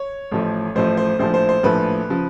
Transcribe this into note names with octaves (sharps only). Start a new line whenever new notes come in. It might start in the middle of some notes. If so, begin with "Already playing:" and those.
Already playing: C#5
A1 A2 F3
A1 A2 F3 C5
C5
A#1 A2 F3 C5
C5
C5
A#1 A2 F3 B4
C#3 F3